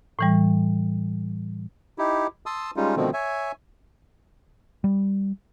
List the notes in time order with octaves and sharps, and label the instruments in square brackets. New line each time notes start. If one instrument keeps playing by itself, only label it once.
[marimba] A2 E3 G3
[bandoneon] D#4 E4 G4
A5 C6 D#6 E6
G3 G#3 C#4 D#4 F4
B2 D3 D#3 F3 A3 C4
C#5 E5 G#5
[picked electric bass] G3